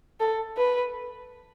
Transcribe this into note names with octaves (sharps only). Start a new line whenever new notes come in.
A4
B4